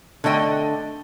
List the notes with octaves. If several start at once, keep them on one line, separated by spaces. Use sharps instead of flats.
D3 A3 D#5 G5